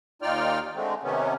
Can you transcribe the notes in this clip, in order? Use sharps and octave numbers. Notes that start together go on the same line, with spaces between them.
D#2 D#4 F4 D5 G5 F6
D3 G#3 A3 C4
C3 D#3 A3 B3 C#4